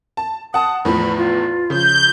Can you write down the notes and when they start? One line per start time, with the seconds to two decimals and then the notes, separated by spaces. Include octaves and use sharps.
0.17 A5
0.54 F#5 A5 D#6
0.85 E2 A2 F3 B5
1.17 F4
1.70 C#3 F3 G6